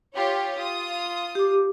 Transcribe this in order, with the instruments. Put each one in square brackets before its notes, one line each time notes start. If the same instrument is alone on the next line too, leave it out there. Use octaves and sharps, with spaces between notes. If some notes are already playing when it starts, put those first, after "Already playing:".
[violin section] F4 G4 C#5
F4 D#6
[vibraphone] G4 D6